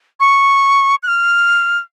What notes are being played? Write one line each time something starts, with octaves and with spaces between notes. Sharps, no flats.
C#6
F#6
F6